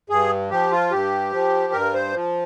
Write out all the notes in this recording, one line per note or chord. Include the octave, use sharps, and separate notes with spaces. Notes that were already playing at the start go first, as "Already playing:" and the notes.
G2 G#4
F3 G4
F4
G2 G4
F3
G2 A#4
C5
F3